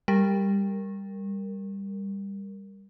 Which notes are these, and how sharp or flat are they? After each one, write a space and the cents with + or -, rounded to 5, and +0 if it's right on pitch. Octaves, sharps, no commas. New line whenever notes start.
G3 +15 A#4 +0